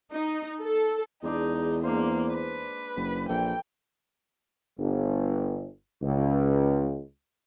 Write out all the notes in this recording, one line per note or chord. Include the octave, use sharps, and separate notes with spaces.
D#4
A4
E2 G#3 D4 D#4 D5
A#3 D4 C5
B4
F#1
A#1 E3 A4 G5
G1
C#2